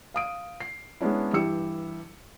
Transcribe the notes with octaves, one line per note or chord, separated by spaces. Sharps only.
F5 D#6 D7
C7
G#3 B3 C#4 D4 E4
G2 E3 E4 G4 E6 C#7